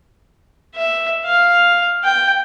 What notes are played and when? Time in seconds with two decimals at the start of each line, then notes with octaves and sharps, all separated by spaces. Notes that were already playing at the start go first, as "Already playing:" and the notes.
0.76 E5
1.26 F5
2.04 G5